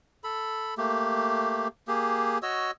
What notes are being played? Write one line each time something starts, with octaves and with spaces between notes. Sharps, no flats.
A4 B5
A3 A#3 G4
A#3 G4 G#4
F#4 C#5 D#5 E6